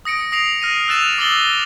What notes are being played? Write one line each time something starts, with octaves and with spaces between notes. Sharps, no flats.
D#6 A#6 C#7 D7
D#6 A#6 C7 F7
F6 A#6 D#7
E6 F#6 A6 E7 F7
D6 D#6 A6 F#7 G7